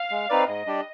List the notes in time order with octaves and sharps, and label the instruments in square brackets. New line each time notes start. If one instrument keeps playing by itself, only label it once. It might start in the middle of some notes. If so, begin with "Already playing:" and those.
Already playing: [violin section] F5
[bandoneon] G#3
C4 D#4 B4 D5
[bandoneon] G#2 [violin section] D#5
[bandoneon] G3 D4 G4 D5